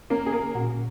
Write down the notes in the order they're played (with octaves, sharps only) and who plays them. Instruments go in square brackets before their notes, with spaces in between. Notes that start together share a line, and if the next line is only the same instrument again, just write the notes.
[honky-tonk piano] A#3 A#4 [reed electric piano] C#4
[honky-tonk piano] G#4
A#3 A#4
[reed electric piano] A#2 [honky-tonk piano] F#4